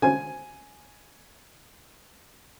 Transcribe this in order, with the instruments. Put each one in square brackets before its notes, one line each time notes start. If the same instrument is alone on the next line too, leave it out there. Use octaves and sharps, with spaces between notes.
[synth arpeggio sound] D3 C#4 C5 [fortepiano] G#5